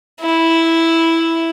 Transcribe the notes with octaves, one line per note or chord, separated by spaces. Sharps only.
E4